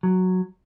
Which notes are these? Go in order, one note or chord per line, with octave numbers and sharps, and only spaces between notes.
F#3